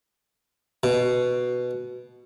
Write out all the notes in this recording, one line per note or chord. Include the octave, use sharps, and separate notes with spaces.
B2